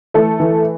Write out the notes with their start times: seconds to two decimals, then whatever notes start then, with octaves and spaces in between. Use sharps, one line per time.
0.14 E3 A3 A4
0.40 E3